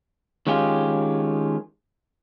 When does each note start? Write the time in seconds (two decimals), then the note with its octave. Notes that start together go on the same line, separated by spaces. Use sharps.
0.47 D#3 G#3 C#4 F4 G4